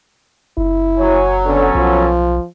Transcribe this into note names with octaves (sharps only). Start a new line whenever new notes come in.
F#1 E4
F#3 C#5 G#5
D3 B3 C#4 A4
B1 F3